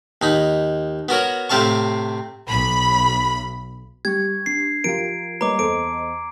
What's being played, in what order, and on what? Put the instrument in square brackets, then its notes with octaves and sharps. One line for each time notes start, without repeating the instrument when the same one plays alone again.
[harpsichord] D#2 D#4 B5
B3 F#4 A#4 C#5
A2 C3 C4 F5 A5 C#6
[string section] B1 B5
[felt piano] G3 [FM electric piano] G4 C#6 [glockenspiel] G#6
[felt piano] D4 [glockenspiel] C7
[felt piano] F3 [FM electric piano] F4 G4 A#4 [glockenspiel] D7
[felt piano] G3 A#3 [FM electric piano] B4 C#5 D#5 [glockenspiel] A#5 D6
[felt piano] E2 [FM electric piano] A4 C5 D#5 [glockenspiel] D7